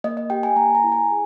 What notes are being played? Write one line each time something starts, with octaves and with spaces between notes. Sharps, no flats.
A#3 D#5
D#5
G4 G5
G#5
A#3 A#5
A#5
E4
G#5
G#4